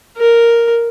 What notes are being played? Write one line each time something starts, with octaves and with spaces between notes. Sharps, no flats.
A#4